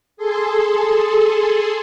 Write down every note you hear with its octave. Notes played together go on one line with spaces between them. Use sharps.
G#4 A4 C6